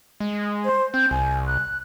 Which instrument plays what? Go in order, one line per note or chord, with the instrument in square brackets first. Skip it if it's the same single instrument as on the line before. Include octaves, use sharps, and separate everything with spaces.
[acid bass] G#3
[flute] C5
[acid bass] C4 [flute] G6
[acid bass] C2 [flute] G#5
[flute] F#6